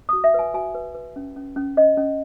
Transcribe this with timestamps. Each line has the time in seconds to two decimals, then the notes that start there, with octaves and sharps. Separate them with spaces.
0.09 F#4 D#6
0.24 E5
0.34 B4 G#5
0.54 F#4 G#5
0.75 B4
0.95 B4
1.16 C#4
1.36 C#4
1.56 C#4
1.77 C#4 D#5
1.97 C#4